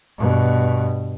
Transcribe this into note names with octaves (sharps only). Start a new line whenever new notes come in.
G2 B2